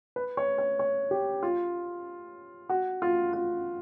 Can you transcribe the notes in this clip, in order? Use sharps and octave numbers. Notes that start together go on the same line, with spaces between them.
B4
C#5
C#5
C#5
G4
F4
F#4
F4
F4